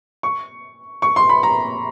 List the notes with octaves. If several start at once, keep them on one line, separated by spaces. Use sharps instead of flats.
C#6
C#6
C6
B5
A#5